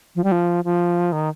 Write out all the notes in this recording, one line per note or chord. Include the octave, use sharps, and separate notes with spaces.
F3
G3
F3
F3
D#3